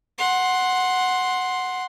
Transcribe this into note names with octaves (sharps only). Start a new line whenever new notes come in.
F#5 C6